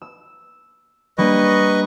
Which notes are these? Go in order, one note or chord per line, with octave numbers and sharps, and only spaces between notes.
E6
G3 A#3 D4 B4 D#5 C#6